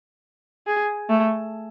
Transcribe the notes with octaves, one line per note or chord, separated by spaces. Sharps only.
G#4
A3